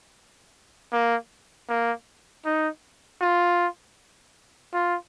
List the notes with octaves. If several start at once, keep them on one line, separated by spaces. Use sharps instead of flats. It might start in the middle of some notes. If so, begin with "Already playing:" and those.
A#3
A#3
D#4
F4
F4